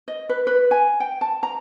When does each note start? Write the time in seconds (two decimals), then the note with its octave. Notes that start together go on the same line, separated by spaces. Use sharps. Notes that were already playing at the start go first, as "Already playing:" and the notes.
0.08 D#5
0.29 B4
0.47 B4
0.71 G#5
1.00 G5
1.21 A5
1.43 A#5